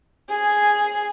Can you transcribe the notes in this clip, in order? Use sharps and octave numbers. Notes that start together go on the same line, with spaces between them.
G#4